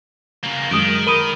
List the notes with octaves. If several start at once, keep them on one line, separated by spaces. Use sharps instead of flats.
C#3 A#3
F#2 D#3 G#3 D#6 D7
A#4 B5 D#6 D#7 G7